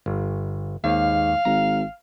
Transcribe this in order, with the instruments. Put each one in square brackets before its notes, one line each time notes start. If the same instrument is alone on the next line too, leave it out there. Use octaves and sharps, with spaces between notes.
[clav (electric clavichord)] G1
[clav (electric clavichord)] D#2 [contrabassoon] G#2 [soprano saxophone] F5
[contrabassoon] G#1 [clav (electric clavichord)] A#5